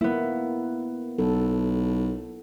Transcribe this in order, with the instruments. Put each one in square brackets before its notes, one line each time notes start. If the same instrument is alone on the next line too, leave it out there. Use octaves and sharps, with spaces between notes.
[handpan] A#3 [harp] B3 E4
[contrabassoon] B1 [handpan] A4